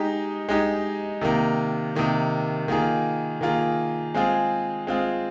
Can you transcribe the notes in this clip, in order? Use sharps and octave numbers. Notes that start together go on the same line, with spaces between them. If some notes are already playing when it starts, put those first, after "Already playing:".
Already playing: G#3 D#4 G4
G#3 D#4 G4
C3 D#3 A#3
C3 D#3 A#3
D#3 A#3 F4 G#4
D#3 A#3 F4 G#4
G#3 C4 F4 G#4
G#3 C4 F4 G#4